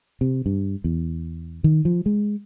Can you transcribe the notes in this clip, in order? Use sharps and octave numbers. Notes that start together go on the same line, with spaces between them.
C3
G2
E2
D#3
F3
G#3